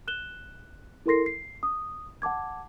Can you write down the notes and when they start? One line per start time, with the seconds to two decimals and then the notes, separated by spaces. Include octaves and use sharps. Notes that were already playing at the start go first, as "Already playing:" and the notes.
0.08 F#6 E7 G7
1.06 E4 A4 A#4 C6 A#6 C7
1.26 C7
1.63 D#6
2.22 F#5 A5 D6 G#6